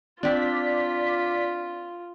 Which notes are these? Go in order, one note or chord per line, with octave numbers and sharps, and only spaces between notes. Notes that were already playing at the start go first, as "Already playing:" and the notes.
C4 D4 F4 D5 B6